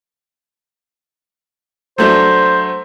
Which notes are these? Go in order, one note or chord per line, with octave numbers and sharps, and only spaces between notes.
F#3 A3 D4 C5